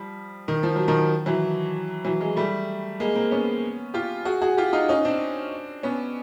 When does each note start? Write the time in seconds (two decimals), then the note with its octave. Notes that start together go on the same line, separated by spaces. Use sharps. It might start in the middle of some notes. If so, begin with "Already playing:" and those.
Already playing: F3 G3
0.48 D#3
0.63 F3
0.76 F#3
0.88 D#3 F3
1.26 E3 F#3
2.05 E3 F#3
2.20 F#3 G#3
2.36 G3 A3
3.00 G#3 A#3
3.15 A#3 C4
3.31 B3 C#4
3.94 F4 G4
4.25 F#4 G#4
4.42 F#4 G#4
4.57 F4 G4
4.73 D#4 F4
4.89 C#4 D#4
5.05 C4 D4
5.83 B3 C#4